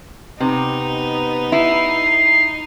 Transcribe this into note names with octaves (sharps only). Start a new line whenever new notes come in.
C3 B3 D#4
E4 C7